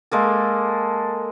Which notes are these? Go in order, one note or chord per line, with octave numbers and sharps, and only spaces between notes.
G#3 A#3 A4